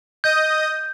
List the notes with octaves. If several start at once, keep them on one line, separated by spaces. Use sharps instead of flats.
D#5 D#6 G6